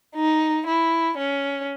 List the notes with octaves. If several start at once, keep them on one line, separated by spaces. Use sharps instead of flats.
D#4
E4
C#4